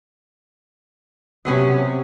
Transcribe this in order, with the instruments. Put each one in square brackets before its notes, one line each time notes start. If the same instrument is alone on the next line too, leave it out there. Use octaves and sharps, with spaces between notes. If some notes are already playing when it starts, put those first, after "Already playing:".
[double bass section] C3 [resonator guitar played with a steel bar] F#3 B3 C#4